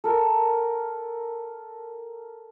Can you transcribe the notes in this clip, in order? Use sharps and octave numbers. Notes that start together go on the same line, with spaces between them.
A4 A#4 G5